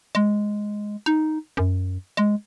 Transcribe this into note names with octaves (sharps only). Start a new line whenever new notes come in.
G#3
D#4
F#2
G#3